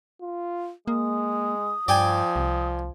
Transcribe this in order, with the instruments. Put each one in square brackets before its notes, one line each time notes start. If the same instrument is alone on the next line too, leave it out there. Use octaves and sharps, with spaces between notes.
[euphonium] F4
[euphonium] G#3 [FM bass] A#3 [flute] D#6
[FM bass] G2 [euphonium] F3 [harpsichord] D5 G5 G#5
[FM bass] C2